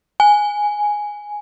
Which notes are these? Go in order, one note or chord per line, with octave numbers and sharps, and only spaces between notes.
G#5